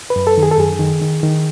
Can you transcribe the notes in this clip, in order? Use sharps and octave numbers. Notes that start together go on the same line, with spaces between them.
B4
F#2
A4
D#3
G#4
A4
F#2 G#4
D#3
D#3
D#3